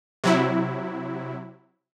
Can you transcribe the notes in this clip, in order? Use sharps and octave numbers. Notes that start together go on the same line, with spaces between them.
C3 F#3 E4